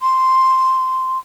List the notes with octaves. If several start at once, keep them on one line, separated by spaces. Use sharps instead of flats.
C6